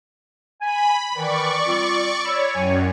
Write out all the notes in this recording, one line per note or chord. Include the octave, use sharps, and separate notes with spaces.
G#5 B5
D#3 E3 D5 C#6
G3 C4 F4
C#5 B5 E6
F#2 A2 C#5 G#5